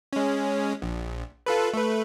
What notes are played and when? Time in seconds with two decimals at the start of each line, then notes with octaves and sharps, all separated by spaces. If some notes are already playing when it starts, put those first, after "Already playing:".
0.13 G#3 C#4
0.82 A#1
1.46 F4 A4 B4
1.74 A3 B4